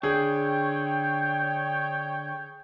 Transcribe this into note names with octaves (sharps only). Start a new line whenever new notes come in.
D3 G#4 C#5 G5